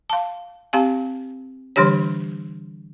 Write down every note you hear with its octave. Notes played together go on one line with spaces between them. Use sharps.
F5 A5
C4 G4 F5 G#5
D3 E3 G3 D4 G4 C#5